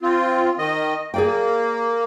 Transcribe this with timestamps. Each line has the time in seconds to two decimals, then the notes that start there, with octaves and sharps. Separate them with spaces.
0.01 C4 F4
0.58 D#3 D#5
1.14 A#3 G#4 D5 G5